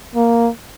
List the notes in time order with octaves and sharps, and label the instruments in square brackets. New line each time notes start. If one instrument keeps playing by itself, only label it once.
[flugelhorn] A#3